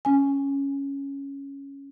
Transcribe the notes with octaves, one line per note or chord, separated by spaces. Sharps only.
C#4 G#5